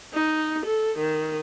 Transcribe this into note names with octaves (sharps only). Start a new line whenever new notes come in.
D#4
A4
D#3